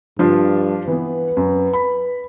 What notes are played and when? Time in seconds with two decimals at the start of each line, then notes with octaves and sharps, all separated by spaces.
0.19 G2 F3 D4 F4
0.88 E3 B3 B4
1.37 F#2
1.73 B5